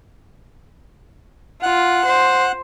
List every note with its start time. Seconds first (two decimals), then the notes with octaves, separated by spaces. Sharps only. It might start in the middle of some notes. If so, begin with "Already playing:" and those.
1.63 F4 F#5
2.05 C5